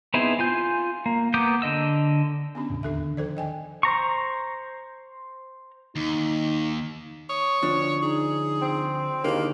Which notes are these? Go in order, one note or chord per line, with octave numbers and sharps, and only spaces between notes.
B3 C4 D#4 E4 G#4
F4 G#5 G6
A#3
A#3 B3 D6 D#6 G6
D3 D#5 E6
B3 C#4 D4
E2 A2 C#3
D#2 D3 D#3 D4 A4 E5
D#3 F3 A4 C5 D5
D#5 G5 G#5
C5 A#5 C#6
D#2 D#4
C#5 D#6
D2 F3 D4
D#4 G#4
C4
D#2 D3 D#3 A#3 E4 G#4 D7